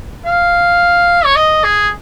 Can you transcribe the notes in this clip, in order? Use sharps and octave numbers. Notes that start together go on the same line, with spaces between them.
F5
C#5
D#5
G#4